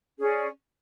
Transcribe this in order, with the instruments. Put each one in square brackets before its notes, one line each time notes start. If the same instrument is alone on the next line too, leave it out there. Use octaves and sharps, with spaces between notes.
[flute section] C#4 G#4 D5